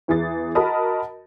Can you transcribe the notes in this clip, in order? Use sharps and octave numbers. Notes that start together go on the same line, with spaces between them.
E2 E3 G#4 A6
F#4 A#4 D#5 A5 B5 D#6